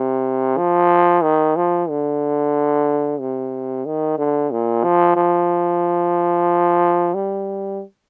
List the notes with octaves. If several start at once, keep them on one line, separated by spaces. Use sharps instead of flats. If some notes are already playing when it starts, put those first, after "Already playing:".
Already playing: C3
F3
D#3
F3
D3
C3
D#3
D3
A#2
F3
F3
G3